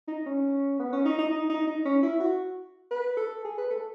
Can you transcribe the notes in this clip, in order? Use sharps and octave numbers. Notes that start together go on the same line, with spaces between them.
D#4
C#4
B3
C#4
D#4
D#4
D#4
D#4
D#4
C#4
E4
F#4
B4
A4
G#4
B4
A4